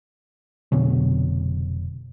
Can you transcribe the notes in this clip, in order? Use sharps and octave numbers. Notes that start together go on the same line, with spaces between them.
F1 B2 D3 F#3